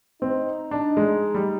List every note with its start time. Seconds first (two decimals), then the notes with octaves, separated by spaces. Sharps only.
0.22 C4 D#4
0.71 D4
0.97 G#3
1.34 G3